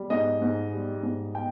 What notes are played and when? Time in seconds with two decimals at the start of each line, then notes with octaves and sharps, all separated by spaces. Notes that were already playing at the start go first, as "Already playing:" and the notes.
Already playing: G3
0.10 G#2 D#5
0.42 G#2
0.73 G3
1.03 G#2
1.35 G5